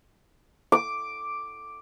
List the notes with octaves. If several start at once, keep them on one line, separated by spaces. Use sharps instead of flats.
D6